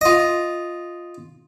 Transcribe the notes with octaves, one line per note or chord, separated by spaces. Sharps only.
F4 D#5